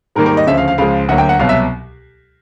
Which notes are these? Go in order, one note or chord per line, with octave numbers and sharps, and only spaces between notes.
G#2 D#3 G3 A#3 A#4
A#4
D#5
D2 C#3 F3 E5
F5
F5
C#2 C#3 F3 G#3 F5
D2 D3 F#3 A#3 F#5
G5
F#5
C2 B2 F#3 F5
E5